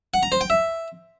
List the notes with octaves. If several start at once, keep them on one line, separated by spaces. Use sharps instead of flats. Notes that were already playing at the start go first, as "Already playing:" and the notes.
F#5
A#5
C5
G5
E5